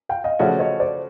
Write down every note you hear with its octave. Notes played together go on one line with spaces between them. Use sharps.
F5 G5
D#5 F5
C#3 F3 A3 C#4 F#4 D5 E5
C#5 D#5
C5 D5